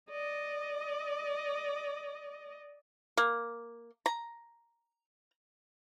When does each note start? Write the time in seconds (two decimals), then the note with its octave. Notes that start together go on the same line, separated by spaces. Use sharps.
0.10 D5 D#5
3.17 A#3
4.06 A#5